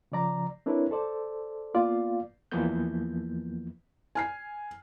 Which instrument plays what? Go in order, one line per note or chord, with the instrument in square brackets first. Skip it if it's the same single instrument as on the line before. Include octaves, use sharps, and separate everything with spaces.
[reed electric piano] C#3 F3 D5 A#5
C4 D4 E4 A#4 B4 C#5
A4 C5 D5
A#3 B3 F4 D5 F5
E2 E3 F3 A#3 B3 G6
[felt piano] G#5 F6 C7